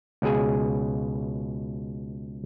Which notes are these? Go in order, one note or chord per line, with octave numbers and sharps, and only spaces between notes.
C#2 B2 G#4 G#5